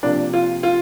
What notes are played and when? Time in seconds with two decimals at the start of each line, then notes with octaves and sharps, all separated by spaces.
0.03 C3 F3 A#3 D4
0.33 F4
0.63 F4